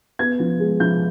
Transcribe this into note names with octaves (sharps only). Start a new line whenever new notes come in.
B3 G#6
F3
G#3
F3 G6